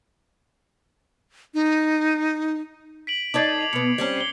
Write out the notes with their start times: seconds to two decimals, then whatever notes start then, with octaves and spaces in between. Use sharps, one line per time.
1.54 D#4
3.07 B6 D7 F#7
3.34 D#4 A4 D5 D6 G#6 C7
3.58 C7 F7 F#7
3.73 B2 B3 C#7
3.98 G3 C4 C#4
4.17 C7 G7